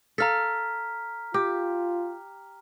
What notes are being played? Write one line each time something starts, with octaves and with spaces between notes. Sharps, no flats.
A4 F5 A#5 F6 B6
F4 G4